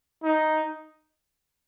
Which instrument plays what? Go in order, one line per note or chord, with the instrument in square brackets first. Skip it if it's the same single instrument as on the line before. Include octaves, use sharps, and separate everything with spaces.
[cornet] D#4